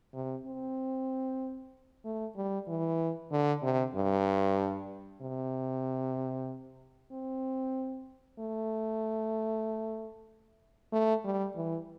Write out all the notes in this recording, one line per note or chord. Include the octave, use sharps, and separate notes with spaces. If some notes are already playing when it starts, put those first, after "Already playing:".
C3
C4
A3
G3
E3
D3
C3
G2
C3
C4
A3
A3
G3
E3